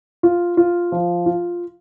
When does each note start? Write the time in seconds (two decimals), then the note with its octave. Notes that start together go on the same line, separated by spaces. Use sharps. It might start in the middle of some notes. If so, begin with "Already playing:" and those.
0.23 F4
0.57 F4
0.92 F3
1.26 F4